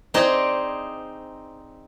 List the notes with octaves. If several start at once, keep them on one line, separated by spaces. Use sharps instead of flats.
C4 D#4 G#4 D5 D#5 G5